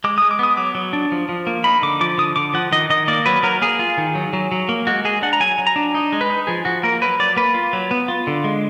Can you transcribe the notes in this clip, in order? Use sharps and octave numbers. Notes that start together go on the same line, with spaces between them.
G#3 D6
G#3 D#6
D6
B3 D#6
F#3 D6
F#3
D4
F3
F3
A#3
D#4 B5
D3 D6
F3 D6
D3 D#6
D3 D6
F3 F#5
D#3 D#5
D#3 D#5
A#3 D5
F#3 B4
F#3 A#4
A#3 G#4
F4
D#3
F#3
F#3
F#3
A#3
G#3 F#4
G#3 G#4
D4 F#5
A#5
F#3 G#5
F#3
A#5
D4
D#4 D#5
G#3
B4
D#4
F3 G#4
F3 F#4
A#3 A#4
F#3 B4
F#3 D5
A#3 B4
F4
F#3
B3
F4
D3
G#3